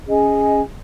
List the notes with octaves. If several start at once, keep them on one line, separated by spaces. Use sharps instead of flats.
C#4 G#4 D#5 G#5